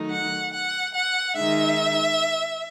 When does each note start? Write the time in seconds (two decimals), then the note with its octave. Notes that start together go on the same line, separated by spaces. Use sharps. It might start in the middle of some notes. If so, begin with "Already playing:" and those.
Already playing: D#3 F#3 A3 D#4
0.10 F#5
0.53 F#5
0.93 F#5
1.35 D#3 G#3 D#4 E5